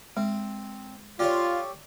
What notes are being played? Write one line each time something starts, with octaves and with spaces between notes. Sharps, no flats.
G#3 C4
F4 G4 A4 C#5 D5